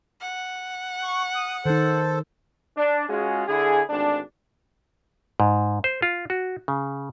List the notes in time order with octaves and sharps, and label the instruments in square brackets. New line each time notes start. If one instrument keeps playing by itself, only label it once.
[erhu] F#5
[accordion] C#6
D#6
[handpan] D#3 D#4 [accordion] A4 C5
[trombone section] D4
G#3 C#4 F4 F#4 G#4
D3 E4 G#4
G#1 D2 D4
[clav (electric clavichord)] G#2
C5
F4
F#4
C#3